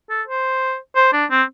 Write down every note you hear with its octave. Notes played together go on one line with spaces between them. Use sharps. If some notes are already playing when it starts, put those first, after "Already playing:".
A4
C5
C5
D4
C4